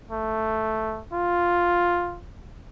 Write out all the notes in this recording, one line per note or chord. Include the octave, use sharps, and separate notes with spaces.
A3
F4